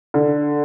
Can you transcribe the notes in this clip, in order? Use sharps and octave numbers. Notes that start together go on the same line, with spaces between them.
D3